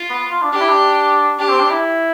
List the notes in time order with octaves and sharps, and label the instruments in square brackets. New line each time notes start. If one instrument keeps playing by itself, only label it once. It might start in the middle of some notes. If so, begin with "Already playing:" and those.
Already playing: [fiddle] F4
[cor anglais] B3
F4
D4
[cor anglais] D4 [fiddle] G4
[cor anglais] E4
D4
[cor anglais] D4 [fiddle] G4
[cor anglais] C4
D4
E4